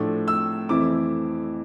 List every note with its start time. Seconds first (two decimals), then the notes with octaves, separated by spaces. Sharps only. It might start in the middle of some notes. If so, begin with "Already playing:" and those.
Already playing: A2 F3 A3 D4
0.28 E6
0.69 F2 E3 A3 C4 E4 D6